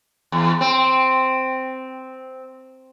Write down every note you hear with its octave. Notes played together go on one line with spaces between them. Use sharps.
E2
C4